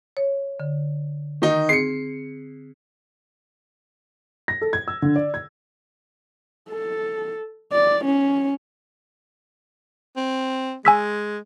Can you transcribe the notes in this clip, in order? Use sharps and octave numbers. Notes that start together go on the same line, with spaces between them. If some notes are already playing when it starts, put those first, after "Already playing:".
C#5
D3
D#3 D#4
C4 G#4 C7 C#7
A#6
A4
G#6
E6
D3
D5
G#6
A4
D5
C#4
C4
G#3 G#5 E6 B6